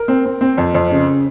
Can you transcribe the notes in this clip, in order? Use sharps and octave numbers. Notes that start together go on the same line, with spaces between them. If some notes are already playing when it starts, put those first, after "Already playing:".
Already playing: A#4
C4
C4
C4
F2
F2
C#3